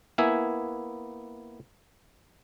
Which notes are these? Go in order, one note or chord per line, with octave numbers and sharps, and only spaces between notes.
A#3 B3 E4 E5 G#5